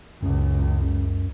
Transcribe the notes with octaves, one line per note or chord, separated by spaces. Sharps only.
C#2 F#2